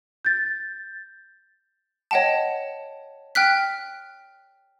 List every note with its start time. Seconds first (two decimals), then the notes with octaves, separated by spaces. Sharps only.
0.25 G6 A6
2.11 C#5 D#5 F#5 G5 A5
3.35 G5 F6 F#6 B6